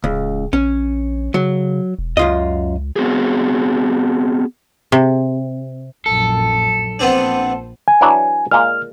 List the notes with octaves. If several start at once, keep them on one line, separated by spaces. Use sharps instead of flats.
D1 C#2
A#1 C#4
C#3 F#3
E1
C#2 F#2 F4 D#5
B3 C4 F#4 G#4
C3
A#1 F#2 A4
A#1 B3 C4 D4 C5
G#5
E3 F#3 D4
A#2 G#3 A#3 F6